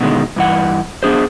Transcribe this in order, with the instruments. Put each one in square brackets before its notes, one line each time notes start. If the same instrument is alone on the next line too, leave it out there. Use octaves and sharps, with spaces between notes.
[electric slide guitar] B2 D3 D#3 G#3
G2 E3 F#5
B3 D4 G#4 C5